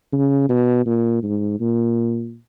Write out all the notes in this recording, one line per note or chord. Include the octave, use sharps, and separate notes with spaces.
C#3
B2
A#2
G#2
A#2